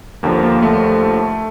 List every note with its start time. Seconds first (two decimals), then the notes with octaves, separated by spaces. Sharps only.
0.23 D#2 D3 F3 A#3
0.43 A#3
0.63 A3